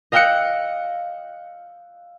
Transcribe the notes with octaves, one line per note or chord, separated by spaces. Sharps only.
D#5 F5 G5 E6 F#6 C#7